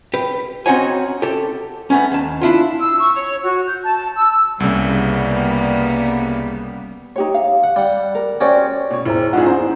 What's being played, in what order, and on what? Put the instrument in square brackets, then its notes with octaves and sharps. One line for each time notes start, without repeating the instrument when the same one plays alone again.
[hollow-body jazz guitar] G4 B4
C4 C#4 D#4 F#4 C#5 G#5
G4 A4
A3 B3 C#4
D#2 A5
D4 E4 F4
[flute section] E6
C#6
C#5
F#4
G6
A5
E6
[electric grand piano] C2 C#3 [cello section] G3 A#3 B3
[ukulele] D#4 G4 C#5
F5
[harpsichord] F#5
G3 F#5
[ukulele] A#4
[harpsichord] C#4 F#4 G4 [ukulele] C5 D5
[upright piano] B2 C#5
[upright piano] E1 [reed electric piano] E4 C5 A#5
[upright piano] G2 D4 G#4 [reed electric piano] D#4 F4 F#5
[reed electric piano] C#4 [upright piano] G#4 C5 A#5
[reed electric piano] B3 E4